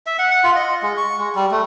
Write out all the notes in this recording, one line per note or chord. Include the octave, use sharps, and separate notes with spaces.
E5
F#5
F#5
F4
D#5
G#3
C#6
G#3
G3
A3